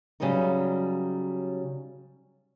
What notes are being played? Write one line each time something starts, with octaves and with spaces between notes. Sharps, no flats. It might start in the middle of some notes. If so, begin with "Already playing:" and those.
C#3 F#3 G3 B3 D#4